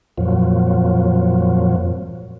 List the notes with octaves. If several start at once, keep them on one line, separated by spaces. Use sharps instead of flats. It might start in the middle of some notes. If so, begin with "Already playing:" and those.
F2 A#2 F3 F#3